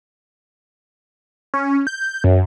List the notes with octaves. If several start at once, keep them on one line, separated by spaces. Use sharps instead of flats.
C#4
G6
F#2